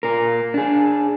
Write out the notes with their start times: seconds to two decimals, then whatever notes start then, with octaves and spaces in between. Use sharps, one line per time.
0.03 A#2 A#4
0.54 D4 G#4